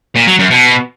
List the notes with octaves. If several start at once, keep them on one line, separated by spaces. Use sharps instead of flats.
A#2
F#3
F#2
B2